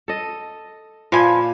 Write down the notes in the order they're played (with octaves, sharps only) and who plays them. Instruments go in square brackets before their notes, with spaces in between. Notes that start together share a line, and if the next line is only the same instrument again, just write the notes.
[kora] A4 D#5
[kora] A#2 [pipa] F3 B4 G#5